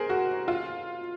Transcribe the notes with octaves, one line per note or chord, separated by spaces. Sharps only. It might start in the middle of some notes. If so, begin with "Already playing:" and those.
Already playing: G#4 A#4 C5
F#4
F4